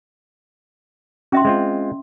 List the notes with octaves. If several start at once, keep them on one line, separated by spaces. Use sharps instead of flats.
C#4 F#4 E5 C6
G#3 C4 F4